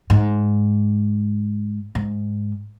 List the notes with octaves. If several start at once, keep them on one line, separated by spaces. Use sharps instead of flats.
G#2
G#2